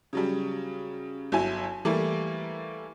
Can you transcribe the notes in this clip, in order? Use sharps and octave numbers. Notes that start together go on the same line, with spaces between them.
C#3 F#3 G3
G1 F#3 E4 G#5
E3 G3 A3 A#3